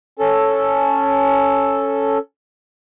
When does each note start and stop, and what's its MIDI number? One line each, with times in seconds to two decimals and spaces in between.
0.19 2.18 61
0.19 2.18 69